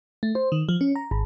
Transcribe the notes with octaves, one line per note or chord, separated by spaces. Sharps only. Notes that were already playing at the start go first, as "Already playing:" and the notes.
A3
C5
D#3
F3
C#4
A#5
G#1